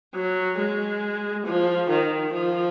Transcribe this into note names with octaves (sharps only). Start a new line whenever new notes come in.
F#3
G#3
F3
D#3
F3